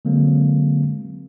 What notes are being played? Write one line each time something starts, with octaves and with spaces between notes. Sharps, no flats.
D3 F#3 G#3 A#3 C4